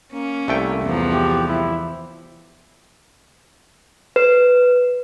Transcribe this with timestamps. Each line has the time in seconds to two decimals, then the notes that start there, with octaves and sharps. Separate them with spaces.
0.13 A#3 C#4
0.48 C2 A3 G5
0.83 E2 F3
1.13 G4
1.48 E4
4.16 B4